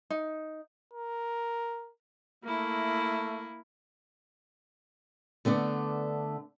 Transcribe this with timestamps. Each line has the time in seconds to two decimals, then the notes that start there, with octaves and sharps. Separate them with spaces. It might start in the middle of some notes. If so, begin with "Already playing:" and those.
0.10 D#4
0.93 A#4
2.44 A3 A#3 E4
5.45 D3 A3 B3 D4